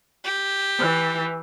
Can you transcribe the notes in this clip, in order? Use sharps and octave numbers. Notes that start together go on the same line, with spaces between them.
G4
E3